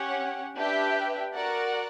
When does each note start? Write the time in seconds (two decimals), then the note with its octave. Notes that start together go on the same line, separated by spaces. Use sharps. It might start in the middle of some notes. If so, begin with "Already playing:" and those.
Already playing: C#4 G4 C#5 F#5
0.56 D4 G4 B4 E5 G5
1.34 F#4 A#4 D5 F#5